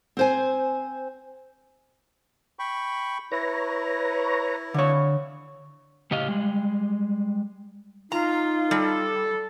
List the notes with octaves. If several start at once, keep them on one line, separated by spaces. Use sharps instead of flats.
C4 C5 G#5
G5 B5 C#6
E4 B4 C#5 A#5
D3 C#5
A2 C#3 G4 D#5 F5
G3 G#3
D#4 F4 A#5
G3 A4